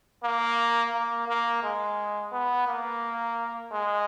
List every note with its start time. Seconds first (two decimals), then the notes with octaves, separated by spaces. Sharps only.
0.23 A#3
0.93 A#3
1.28 A#3
1.63 G#3
2.32 B3
2.67 A#3
3.72 G#3